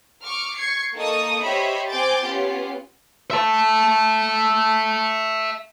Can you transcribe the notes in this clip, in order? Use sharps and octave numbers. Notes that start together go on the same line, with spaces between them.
C#6 D6 F6
C#6 G#6 C7 C#7
A#3 D#4 A4 C#6 D#6
G4 C5 C#5 D#5 E5 B5
C4 G#5 D6 G6 A6
B3 C#4 F4 G4
E5 A5